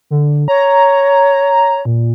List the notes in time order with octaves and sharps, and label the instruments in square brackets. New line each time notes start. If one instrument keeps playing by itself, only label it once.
[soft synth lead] D3
[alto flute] C#5 [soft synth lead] A#5
[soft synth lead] A#2